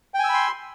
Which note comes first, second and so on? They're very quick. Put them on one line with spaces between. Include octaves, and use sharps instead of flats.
G5 G#5 E6 B5 C6